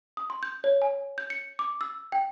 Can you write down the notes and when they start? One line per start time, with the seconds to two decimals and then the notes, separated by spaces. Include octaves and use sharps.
0.17 D#6
0.30 C6
0.43 G6
0.64 C#5
0.82 G#5
1.18 G6
1.30 C#7
1.59 D6
1.81 E6
2.12 G5